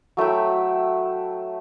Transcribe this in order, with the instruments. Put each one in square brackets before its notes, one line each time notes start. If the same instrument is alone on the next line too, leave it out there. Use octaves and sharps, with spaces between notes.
[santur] F#3 A3 E4 G5